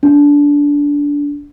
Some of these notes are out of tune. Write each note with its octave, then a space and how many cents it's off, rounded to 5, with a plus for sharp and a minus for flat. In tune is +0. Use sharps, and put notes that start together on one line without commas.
D4 -20